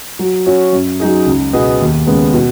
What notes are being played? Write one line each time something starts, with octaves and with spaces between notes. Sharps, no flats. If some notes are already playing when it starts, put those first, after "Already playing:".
F#3
C#4 F#4
F#2
F#3 D#4 G#4
C#2
B2 B3 G#4 D#5
D#2
C#3 G#3 B3
B2